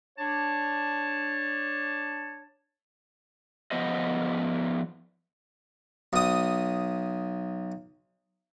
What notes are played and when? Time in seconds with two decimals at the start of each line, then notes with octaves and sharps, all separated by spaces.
0.18 D4 C#5 A5
3.71 F3 B3 B4 C5 D#5
6.13 B1 D#6